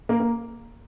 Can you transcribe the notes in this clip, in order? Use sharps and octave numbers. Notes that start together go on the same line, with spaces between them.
A#3
A#3